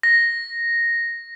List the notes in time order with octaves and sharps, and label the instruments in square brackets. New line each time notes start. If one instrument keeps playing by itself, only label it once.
[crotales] A#6